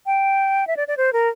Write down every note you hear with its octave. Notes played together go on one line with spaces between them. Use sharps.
G5
E5
D5
D5
C5
A#4